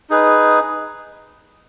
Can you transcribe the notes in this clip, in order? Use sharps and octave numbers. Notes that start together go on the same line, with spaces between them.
D#4 G#4 B4